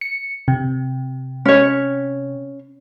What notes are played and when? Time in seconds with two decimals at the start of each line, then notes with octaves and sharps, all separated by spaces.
0.01 C#7
0.48 C3
1.45 C#4 C#5